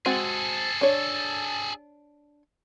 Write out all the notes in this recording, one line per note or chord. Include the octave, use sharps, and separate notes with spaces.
G#3 C4 F#4 G#4 A4
D4 C#5